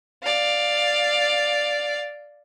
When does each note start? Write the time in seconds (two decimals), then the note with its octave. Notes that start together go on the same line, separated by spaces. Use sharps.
0.23 D5 F5